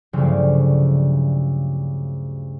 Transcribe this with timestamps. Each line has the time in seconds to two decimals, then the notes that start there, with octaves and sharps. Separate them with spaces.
0.13 D2 G2 C#3 F3 F#3 C4